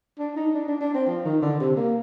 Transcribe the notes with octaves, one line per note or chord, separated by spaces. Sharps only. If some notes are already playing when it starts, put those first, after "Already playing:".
D4
D#4
D4
D4
D4
C4
F3
D#3
D3
C3
A#3